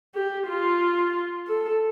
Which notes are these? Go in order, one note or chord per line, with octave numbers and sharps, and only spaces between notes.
G4
F4
A4